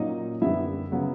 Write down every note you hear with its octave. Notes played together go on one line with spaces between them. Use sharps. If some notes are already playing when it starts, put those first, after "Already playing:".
Already playing: A#2 F#3 A#3 C#4 D#4 D#5
F#2 D3 G3 B3 E4 E5
C#3 F#3 B3